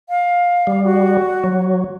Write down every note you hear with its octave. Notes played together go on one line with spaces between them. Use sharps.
F5
G3
F#4
F#3